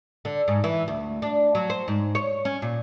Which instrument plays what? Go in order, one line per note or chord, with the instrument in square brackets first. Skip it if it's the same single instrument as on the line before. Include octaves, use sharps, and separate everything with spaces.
[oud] D3
G#2
E3
D2
D4
F#3
C5
G#2
C#5
C#4
A#2